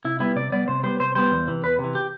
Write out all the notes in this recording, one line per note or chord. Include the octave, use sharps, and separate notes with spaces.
C3 E4
G3 B3 E4
C3 D5
G3 B3 D5
C3 C5
G3 B3 C5
C3 C5
G3 B3 C5
E2
C3 E3
E2 B4
C3
E3
G4